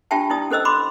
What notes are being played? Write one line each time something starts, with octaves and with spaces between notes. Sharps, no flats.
D4 F4 G4 E5 G5 A5
D#4 E4 D5 D#6
C#4 A4 C5 D#5 E6
B5 C6 D6